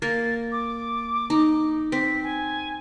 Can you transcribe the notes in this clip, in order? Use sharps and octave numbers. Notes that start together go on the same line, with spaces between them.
A#3 A6
D6
D#4
C4 B6
G#5